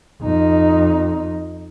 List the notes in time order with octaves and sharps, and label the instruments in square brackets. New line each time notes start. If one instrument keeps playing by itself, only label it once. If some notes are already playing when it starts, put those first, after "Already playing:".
[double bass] F2 D#4